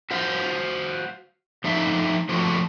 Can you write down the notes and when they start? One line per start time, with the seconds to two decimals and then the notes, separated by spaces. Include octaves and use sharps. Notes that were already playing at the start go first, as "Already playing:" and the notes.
0.11 F#4 C5 F5
1.64 F3 A3 D4 D#4 E5 F5
2.29 F3 A3 D4 F4 F#4